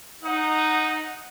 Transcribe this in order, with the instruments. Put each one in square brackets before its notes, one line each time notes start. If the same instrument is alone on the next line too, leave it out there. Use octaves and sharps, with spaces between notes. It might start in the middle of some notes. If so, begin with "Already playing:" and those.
[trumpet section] D#4 [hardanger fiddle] F#5